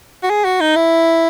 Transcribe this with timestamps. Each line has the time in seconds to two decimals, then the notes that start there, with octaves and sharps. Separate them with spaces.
0.23 F#4
0.30 G#4
0.45 F#4
0.61 D#4
0.76 E4